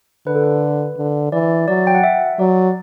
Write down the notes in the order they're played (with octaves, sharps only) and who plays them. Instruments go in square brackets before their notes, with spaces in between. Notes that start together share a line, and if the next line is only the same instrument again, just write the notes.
[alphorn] D3 [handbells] B4
[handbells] A4
B4
[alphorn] D3
[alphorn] E3 [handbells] D5
[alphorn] F#3 [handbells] D5
[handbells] G5
F#5
E5
[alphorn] F#3 [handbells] D5